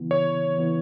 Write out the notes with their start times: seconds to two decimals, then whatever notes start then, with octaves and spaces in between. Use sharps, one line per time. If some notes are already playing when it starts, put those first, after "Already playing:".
Already playing: C#3 E3 B3 E4
0.11 C#3 C#5
0.57 E3 B3 E4